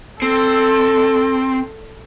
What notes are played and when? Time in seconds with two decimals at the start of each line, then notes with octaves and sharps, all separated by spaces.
0.22 C4 A4